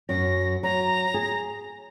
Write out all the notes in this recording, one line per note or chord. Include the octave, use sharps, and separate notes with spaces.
F#2 F#3 A#6
F#3 A#5
G#4